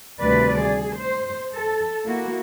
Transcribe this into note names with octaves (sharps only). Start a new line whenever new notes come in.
D2 C3 D#3 G3 B4 D5
G#4
C5
A4
A#3 E4 F#4